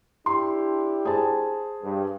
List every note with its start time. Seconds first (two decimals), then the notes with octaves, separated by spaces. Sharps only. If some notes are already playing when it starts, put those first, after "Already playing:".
0.26 D4 E4 G4 C6
1.05 G#4 C5 A5
1.83 G2